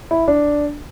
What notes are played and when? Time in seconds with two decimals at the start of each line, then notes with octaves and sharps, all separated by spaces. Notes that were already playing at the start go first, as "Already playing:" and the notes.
0.11 E4
0.28 D4